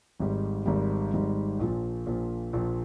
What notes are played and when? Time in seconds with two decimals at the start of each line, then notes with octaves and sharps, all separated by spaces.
0.20 G#1 G#2 G3
0.66 G#1 G#2 G3
1.13 G#1 G#2 G3
1.59 A#1 A#2 F3
2.06 A#1 A#2 F3
2.53 A#1 A#2 F3